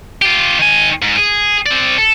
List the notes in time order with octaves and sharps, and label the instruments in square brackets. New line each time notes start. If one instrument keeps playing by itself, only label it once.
[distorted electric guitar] F4 G4
D#3 G#5
G#2
G#4
C4 D5
A4